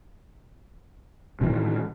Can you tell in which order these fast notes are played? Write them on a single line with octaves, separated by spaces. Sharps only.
C3 E3 D#3 A2